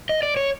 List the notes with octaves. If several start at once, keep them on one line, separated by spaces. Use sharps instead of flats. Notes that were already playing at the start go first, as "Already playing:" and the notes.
D#5
D5
C#5